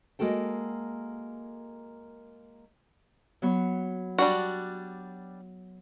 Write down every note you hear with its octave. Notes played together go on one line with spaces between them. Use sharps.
G#3 A#3 F#4 A4 G5
F#3 B3 C#5
G3 D4 F#4